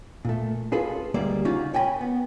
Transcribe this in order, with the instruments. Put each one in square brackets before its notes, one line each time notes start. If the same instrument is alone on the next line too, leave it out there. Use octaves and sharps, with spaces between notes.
[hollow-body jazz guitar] A#2 A3
C#4 F4 F#4 G#4 A4 B4
D2 G3 G#3 A#3 D5 E5
C#3 C#4 D#4 F4 F#4
C#5 G5 G#5 A#5 B5
B3